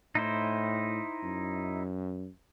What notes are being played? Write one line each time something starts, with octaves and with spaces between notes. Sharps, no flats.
A2 D#4 E4 C5
F#2